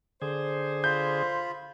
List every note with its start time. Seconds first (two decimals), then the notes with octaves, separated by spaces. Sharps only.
0.22 D3 G#4 C5
0.84 F4 B5 G6